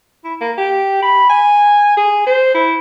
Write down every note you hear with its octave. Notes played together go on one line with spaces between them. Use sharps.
E4
A#3
G4
B5
G#5
G#4
C5
E4